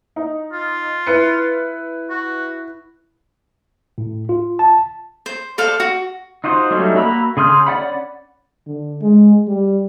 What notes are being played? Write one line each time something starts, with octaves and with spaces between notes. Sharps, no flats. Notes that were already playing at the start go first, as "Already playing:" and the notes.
D#4
F4
E4 B4 C#7
F#4
A2
F4
A5
C5
A4 C5 D5 F5
F#4
D#4 F4 F#4 C5
F#3 G3 A3 C#4 D#4
A#3 F#4 A#5 B5 E6
C#3 G#4 C6 F6 G6
C#4 D5 F#5 B5
D3
G#3
G3